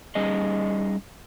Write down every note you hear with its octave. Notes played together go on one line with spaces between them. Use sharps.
G3 C#4 D#4 G#4 D#5